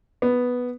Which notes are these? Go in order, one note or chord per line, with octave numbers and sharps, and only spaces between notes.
B3